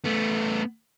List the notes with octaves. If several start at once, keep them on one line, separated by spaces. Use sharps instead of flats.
A3 B3